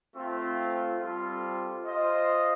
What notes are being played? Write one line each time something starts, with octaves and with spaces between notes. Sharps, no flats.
A3 C4 F4
G3 C4 F4 A4
F4 C5 D#5